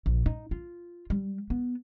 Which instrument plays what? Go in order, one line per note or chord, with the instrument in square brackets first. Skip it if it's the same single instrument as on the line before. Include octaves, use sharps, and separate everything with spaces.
[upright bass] A#1
D#4
F4
G3
B3